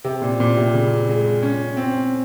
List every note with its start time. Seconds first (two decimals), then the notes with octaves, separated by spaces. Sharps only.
0.04 C3
0.22 A#2
0.40 A#2
0.57 C3
0.74 C#3
1.09 G#3
1.43 C#4
1.77 C4